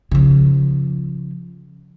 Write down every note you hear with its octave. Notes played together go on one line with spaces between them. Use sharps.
C#3 F3